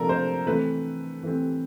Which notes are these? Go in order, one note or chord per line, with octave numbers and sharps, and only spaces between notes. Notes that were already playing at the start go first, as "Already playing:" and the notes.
Already playing: C3 F3 A#3 D4 A4 A#4
C5
E3 A3 C4 B4
E3 A3 C4